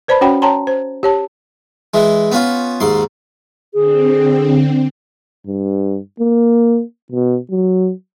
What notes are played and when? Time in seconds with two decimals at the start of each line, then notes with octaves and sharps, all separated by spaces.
0.08 B4 C5 D5 A5 B5
0.21 C#4 F#4 C#5 F#5 G5 B5
0.42 C#5 G5 A5 A#5 C6
0.67 C5
1.03 G4 C#5 A5
1.94 E3 G#3
2.32 B3 C#4 F4
2.80 D#2 G#2 C6
3.74 D3 C4 G#4
5.47 G2
6.20 A#3
7.12 B2
7.51 F#3